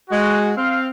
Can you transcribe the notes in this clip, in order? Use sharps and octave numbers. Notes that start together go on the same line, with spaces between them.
G#3 F#4
C4 F5